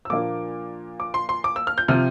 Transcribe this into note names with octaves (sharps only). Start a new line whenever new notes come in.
E6
A#2 F3 A#3 D4 F4 D6
D6
C6
C6
D6
E6
F6
G6
C3 F3 C4 F6